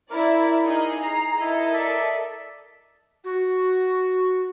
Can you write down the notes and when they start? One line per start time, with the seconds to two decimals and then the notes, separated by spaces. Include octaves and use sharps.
0.10 E4 A#4 D5
0.63 D#4 G#4 D#5
1.01 G#4 A#5 C7
1.40 E4 A4 A#4 D#5
1.74 D5 E5
3.24 F#4